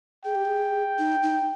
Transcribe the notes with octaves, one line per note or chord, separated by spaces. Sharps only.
G#4 G5
G4
G#4
D#4
D#4